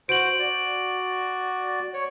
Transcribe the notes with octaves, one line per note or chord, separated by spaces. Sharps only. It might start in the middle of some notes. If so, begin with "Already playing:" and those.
F#4 C5 D7 F#7
F#4 D5
C#5